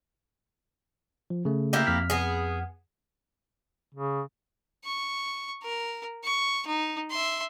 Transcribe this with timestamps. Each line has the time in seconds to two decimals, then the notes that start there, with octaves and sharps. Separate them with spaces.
1.30 F3
1.45 C#3 A3
1.73 A#3 E4 G4
1.87 F2 F6 B6
2.10 B3 G#4
3.94 C#3
4.84 C#6
5.62 A#4
6.24 C#6
6.67 D#4
7.10 E5 C6